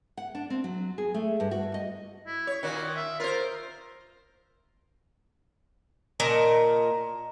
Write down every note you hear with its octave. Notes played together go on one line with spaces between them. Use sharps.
F#5
D4
C4
F#3
G#4
A3
G2
F#4
D#5
E4
C#5
A#2 D#3 F#4
E5
F4 A#4 C5
A#2 A#4 D#5 A5